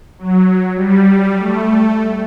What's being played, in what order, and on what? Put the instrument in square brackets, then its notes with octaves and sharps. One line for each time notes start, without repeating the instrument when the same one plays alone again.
[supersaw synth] F#3
G3
A3